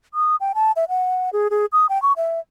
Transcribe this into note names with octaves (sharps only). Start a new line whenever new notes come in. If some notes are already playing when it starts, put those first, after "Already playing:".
D#6
G5
A5
E5
F#5
G#4
G#4
D#6
G5
C#6
E5